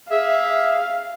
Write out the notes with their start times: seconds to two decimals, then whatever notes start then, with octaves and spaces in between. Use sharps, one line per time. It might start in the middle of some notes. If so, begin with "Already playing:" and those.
0.11 G#4 E5 F5